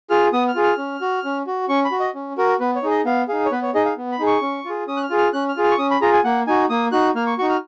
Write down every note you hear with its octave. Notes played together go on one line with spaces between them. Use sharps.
F4 G#4 F6
B3 D#6
F6
F4 G#4
F6
C#4
F#4
C#4
F#4
C#4 C#6
B5
F#4
D#5
C#4
F#4 A#4
B3 B4
C#5
D#4 G#4
D#5
B3 F5
D#4 G#4 F5
C#5
B3 B4
C#5
D#4 G#4 D#5
F5
B3
B5
D#4 G#4
C#6
C#4
F4 G#4
C#4 D#6
F#6
F6
F4 G#4
F6
C#4 F#6
F6
F4 G#4
F6
C#6
C#4 D#6
B5
F4 G#4 A#5
G#5
A#3 F#5
D#4 F#4 G#5
A#3 D#6
D#4 F#4 F#6
A#3 F6
C#6
D#4 F#4 C#6
F6